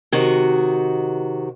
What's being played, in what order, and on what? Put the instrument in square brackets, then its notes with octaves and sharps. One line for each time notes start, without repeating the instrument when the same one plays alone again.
[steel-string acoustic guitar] C3 D#3 F#4